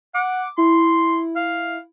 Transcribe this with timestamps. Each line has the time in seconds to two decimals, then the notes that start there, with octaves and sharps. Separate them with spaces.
0.14 F#5 D6
0.58 E4 C6
1.36 F5